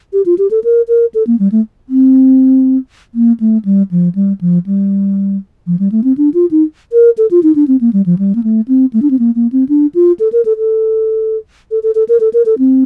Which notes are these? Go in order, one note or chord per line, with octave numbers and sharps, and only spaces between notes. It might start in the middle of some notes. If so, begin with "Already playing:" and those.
G4
F4
G4
A4
A#4
A#4
A4
A#3
G3
A3
C4
A#3
A3
G3
F3
G3
F3
G3
F3
G3
A3
C4
D4
F4
D#4
A#4
A4
F4
D#4
D4
C4
A#3
G3
F3
G3
A#3
A3
C4
A3
D4
C4
A#3
A#3
C4
D4
F4
A4
A#4
A4
A4
A4
A4
A4
A#4
A4
A#4
A4
C4